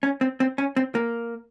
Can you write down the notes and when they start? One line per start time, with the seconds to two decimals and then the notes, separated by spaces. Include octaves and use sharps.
0.03 C#4
0.21 C4
0.40 C4
0.58 C#4
0.76 C4
0.95 A#3